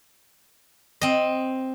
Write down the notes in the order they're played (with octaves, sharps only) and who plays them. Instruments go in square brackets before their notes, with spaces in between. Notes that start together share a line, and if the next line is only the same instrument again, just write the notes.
[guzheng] C4 D#5